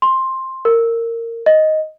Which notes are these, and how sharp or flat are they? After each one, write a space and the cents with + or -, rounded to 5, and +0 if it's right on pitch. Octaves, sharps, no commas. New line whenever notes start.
C6 +10
A#4 -20
D#5 +5